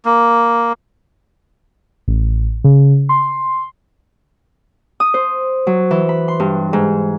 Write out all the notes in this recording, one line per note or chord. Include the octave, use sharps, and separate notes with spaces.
A#3
A1
C#3
C6
D#6
C5
F#3
E3
B5
C6
G2
G#2